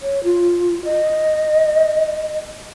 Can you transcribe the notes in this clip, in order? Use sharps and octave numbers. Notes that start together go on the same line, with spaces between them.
C#5
F4
D#5